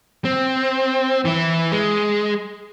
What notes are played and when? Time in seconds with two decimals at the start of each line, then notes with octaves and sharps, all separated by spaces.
0.25 C4
1.25 E3 E4
1.72 G#3